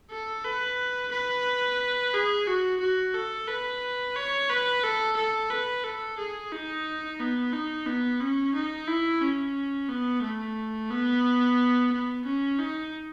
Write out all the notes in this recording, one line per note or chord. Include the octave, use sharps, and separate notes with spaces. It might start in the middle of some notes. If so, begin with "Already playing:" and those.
A4
B4
B4
G#4
F#4
F#4
A4
B4
C#5
B4
A4
A4
B4
A4
G#4
D#4
B3
D#4
B3
C#4
D#4
E4
C#4
B3
A3
B3
B3
C#4
D#4